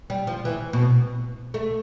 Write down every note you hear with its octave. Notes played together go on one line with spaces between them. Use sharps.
G3
F3
E3
B2
A3